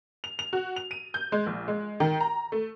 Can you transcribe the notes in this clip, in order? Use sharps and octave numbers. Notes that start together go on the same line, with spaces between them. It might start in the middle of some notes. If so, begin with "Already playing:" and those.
F7
F7
F#4
F7
D#7
G6
G#3
A#1
G#3
D#3
A#5
A3